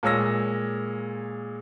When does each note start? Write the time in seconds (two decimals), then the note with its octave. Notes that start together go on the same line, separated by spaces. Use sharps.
0.03 A#2 G#3 C#5 E6 A#6